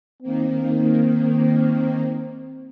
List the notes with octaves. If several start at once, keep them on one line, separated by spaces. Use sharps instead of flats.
D#3 A#3 C4